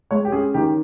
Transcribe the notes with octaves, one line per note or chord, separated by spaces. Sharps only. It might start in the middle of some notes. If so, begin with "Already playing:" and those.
G#3 C#5
G4
C#4 G#4
D#3 G4